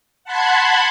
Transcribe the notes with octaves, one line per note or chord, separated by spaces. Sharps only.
F#5 A5 B5 C6 F#6 G#6